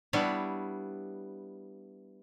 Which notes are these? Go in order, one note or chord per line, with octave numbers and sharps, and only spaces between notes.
G3 B3 D4 E4 B4 C#5